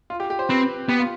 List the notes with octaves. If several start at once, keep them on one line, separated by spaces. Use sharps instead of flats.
F4
G4
G4
C5
C4 B4
B3 G4
F4